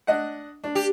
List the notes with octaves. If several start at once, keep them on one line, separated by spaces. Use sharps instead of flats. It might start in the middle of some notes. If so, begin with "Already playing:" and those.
D4 D#5 F#5
D4
G4